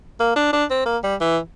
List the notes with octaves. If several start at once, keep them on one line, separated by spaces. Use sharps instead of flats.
A#3
D4
D4
C4
A#3
G3
E3